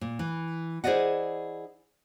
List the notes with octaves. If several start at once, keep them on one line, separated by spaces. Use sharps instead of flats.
A#2
E3
E4 G#4 C5 D5 D#5 F#5